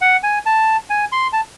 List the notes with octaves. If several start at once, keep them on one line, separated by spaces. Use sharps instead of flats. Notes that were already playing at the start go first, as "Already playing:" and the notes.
F#5
G#5
A5
G#5
C6
A5